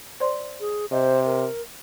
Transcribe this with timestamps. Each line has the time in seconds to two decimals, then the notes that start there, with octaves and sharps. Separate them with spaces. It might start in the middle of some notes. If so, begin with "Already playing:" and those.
0.20 C5 D5 C6
0.61 G#4
0.92 C3 C5 D#5
1.25 A#4